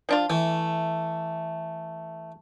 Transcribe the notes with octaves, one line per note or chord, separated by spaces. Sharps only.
F3 D4 F4
E3 A3